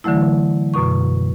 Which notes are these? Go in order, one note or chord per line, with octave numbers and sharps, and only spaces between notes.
D3 E3 F#3 A3 E4
F#2 B2 C#6